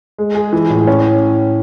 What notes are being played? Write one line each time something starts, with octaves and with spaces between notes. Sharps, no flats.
G#3
G#4
E3
A2
C#4